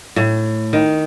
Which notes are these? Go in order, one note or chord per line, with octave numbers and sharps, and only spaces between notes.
A2
D#3